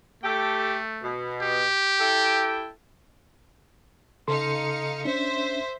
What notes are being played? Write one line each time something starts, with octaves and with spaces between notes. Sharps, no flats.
A3 G4 A4 G5
B2
G4
E4 A4 G5
C#3 D#4 A4 F5 C6 C#7
C#4 D4 C5 E5